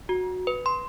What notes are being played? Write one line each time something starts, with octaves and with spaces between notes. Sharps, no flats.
F#4
B4
C6